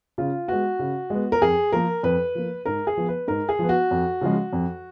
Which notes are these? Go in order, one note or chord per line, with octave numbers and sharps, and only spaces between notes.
C#3 F4
G#3 B3 F#4
C#3
G#3 B3
A#4
F2 G#4
F3 A#3 A#4
F2 B4
F3 A#3
G#2 A#4
G#4
F3 B3
B4
G#2 A#4
G#4
F3 B3
F#4
F2
C#3 F3 G#3
F2